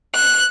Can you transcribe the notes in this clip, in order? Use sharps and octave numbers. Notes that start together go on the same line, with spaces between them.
F#6